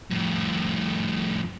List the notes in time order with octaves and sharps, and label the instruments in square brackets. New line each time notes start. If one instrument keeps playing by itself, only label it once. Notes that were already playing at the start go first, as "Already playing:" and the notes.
[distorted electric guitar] F2 A2